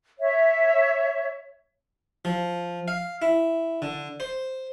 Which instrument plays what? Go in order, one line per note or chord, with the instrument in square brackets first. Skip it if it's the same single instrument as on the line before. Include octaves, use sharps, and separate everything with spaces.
[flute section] C#5 E5
[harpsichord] F3
F5
E4
D3
C5